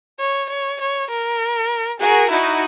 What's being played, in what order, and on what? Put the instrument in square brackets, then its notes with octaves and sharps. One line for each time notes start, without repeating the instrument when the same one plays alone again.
[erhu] C#5
C#5
C#5
A#4
[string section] F#4 A#4 [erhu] G#4
[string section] D#4 F#4 [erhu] E4